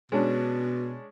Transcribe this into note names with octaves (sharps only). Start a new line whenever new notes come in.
B2 G#3 C#4 D4